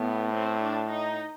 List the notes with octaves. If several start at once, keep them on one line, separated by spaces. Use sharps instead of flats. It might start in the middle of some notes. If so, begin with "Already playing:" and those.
Already playing: A2 B3
C4
D4
D#4